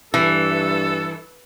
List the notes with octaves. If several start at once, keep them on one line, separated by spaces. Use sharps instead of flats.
G2 E3 A4